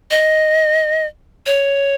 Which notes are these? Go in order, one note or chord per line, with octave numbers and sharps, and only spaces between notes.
D#5
C#5